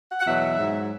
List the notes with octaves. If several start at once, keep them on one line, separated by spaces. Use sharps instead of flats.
F#5
F#5
E2 B2 F#3 E5
G#2 F#3